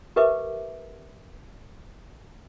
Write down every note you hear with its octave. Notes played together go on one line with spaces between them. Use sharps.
G4 A#4 B4 E5 D6